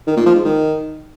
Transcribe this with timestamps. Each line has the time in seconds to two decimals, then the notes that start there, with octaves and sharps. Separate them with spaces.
0.07 D#3
0.17 A#2
0.26 F3
0.35 G#2
0.45 D#3